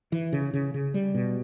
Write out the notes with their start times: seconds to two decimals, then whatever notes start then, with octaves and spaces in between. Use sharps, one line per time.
0.12 E3
0.33 C#3
0.54 C#3
0.74 C#3
0.94 G3
1.14 B2